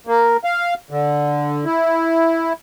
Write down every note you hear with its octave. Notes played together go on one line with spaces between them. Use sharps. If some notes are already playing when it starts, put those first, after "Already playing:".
A#3
F5
D3
E4